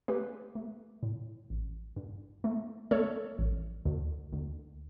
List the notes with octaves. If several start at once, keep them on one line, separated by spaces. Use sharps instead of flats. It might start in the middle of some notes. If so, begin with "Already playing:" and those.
A3 G4 B4
A3
A2
A1
G2
A3
A3 A4 C#5
A1
D2
D2